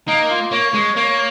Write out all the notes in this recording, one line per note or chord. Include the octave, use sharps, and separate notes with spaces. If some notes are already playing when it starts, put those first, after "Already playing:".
A#3 D#4
F4
A#3 C#5
G#3
A#3 C#5